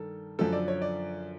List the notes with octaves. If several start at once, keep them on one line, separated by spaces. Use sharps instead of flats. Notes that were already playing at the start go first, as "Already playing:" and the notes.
Already playing: G2 D#3 A4
F#2 D3 F3 A4
D5
C#5
D5